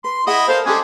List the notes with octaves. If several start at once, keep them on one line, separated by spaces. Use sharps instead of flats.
B4 C6
E4 G#4 D#5 F#5
A4 A#4 C5 D5 F5
G3 G#3 C#4 D4 G4 A4 G#5